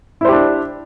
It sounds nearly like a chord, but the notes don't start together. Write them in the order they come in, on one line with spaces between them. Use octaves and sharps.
E4 C5 G4 D4